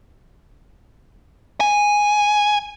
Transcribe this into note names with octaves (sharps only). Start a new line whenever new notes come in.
G#5